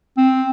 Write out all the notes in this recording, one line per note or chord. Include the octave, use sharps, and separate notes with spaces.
C4